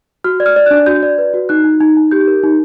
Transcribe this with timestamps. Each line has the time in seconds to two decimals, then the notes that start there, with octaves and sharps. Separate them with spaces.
0.24 F#4 F6
0.40 D5
0.46 F6
0.56 D5
0.66 F#6
0.71 D4
0.86 F#4 G6
1.03 D5
1.18 B4
1.34 F#4
1.49 D#4 F#6
1.64 D#4
1.81 D#4
1.97 D#4
2.11 G4 G6
2.27 A#4
2.43 D#4